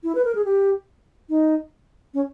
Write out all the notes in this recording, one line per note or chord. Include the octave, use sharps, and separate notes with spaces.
E4
B4
A#4
G#4
G4
D#4
C#4